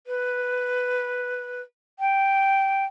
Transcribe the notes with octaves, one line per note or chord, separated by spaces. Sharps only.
B4
G5